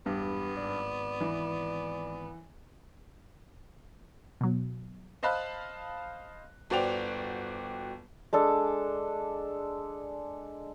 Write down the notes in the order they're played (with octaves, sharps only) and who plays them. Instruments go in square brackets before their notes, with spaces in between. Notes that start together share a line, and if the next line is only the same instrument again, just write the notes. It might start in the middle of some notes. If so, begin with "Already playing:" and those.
[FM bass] E1 [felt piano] G2 [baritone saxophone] B3 [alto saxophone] G4
[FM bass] G#1 [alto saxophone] D5
[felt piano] E3
[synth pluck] B2 F#3
[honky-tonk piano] C5 D#5 F5 A5 B5 F#6
G1 F#4 C5 D5 G5 F7
[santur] G#3 D4 A4